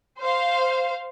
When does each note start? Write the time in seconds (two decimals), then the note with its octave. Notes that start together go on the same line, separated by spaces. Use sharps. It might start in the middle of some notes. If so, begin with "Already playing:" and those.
0.21 C5 F5